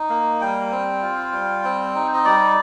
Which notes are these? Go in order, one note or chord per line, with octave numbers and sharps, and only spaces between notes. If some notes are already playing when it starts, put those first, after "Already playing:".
Already playing: D#4
A#3
G3 G5
C4
F4
G3
C4
D#4
D#5
G3 D5